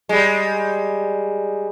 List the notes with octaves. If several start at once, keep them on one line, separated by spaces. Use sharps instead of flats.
G3 G#3